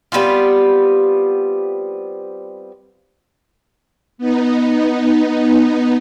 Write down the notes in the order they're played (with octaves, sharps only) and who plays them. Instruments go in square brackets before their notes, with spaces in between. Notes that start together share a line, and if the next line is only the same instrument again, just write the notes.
[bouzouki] G3 B3 C4 F4
[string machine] B3 D#4